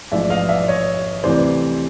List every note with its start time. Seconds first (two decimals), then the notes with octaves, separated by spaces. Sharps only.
0.12 A1 G#2 F3 D5 E5
0.30 D#5 F5
0.49 D5 E5
0.68 C#5 D#5
1.23 D2 C3 E3 C5 D5